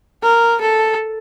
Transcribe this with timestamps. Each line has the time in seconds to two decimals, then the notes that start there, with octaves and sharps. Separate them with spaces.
0.23 A#4
0.61 A4